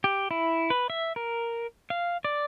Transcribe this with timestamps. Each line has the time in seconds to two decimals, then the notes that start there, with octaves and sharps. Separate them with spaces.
0.04 G4
0.31 E4
0.70 B4
0.90 E5
1.16 A#4
1.90 F5
2.25 D5